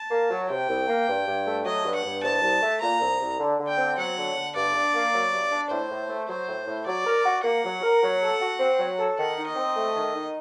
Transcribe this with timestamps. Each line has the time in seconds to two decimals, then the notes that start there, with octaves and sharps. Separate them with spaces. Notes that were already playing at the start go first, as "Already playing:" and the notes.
Already playing: A5
0.10 A#3
0.31 F#3
0.49 C3 G5
0.69 C2
0.88 A#3
1.08 G2
1.27 G2
1.46 A3
1.65 F#3 D#5
1.84 G2
1.95 F#5
2.05 G2
2.23 C2 A5
2.43 C2
2.62 A3
2.81 A#2 A#5
3.01 C2
3.20 C2
3.39 D3
3.58 D3
3.68 G5
3.78 C4
3.97 F#3 F#5
4.17 D3
4.36 D3
4.55 G2 D5
4.74 D4
4.94 A#3
5.13 F#3
5.32 G2
5.51 D4
5.70 A2 C5
5.90 A2
6.09 A3
6.28 F#3 C5
6.47 A2
6.67 A2
6.86 F#3 D5
7.06 A#4
7.25 F#4
7.44 A#3 F#5
7.64 F#3
7.83 A#4
8.02 F#3
8.22 A4
8.41 F#4
8.60 C4
8.80 F#3
8.99 A4
9.18 D#3 F#5
9.38 D#4
9.47 D#5
9.56 C4
9.76 A3
9.96 D#3
10.14 D#4